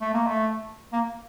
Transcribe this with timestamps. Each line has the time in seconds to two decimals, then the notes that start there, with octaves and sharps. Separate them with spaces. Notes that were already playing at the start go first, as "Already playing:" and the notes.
0.01 A3
0.14 A#3
0.27 A3
0.93 A#3